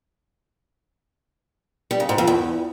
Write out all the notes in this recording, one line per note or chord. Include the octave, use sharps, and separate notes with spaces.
G3
C#3
G#2
F2
E2